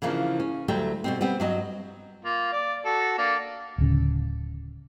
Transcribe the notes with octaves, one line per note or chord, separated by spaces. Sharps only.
C#3 E3 F3 A#3 D4
C#4
D2 F#3 G3 A3 G5
B2 G3 C4
G3 B3 C4
G2 F#3 D#5
A#3 F4
D5
F#4 A4
A#3 D4
D1 C#3